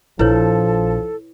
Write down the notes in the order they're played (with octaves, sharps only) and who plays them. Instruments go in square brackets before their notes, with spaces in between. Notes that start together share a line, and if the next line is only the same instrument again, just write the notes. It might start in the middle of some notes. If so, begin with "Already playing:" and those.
[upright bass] A#1 [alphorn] F3 [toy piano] E4 B4 C#5 [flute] A4